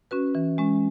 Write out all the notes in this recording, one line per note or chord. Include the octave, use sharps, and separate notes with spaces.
C#4 F#4 B4
E3
G#3 C#4